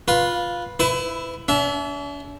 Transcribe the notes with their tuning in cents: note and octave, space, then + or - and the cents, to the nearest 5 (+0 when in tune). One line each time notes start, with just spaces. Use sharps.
F4 +5 B4 -10
E4 +0 B4 +30
D4 -45 E5 +0